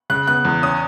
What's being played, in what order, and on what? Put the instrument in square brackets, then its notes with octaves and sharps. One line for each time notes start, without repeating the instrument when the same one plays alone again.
[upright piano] C#3 F#6
B3 F#6
E2
C#4 D#6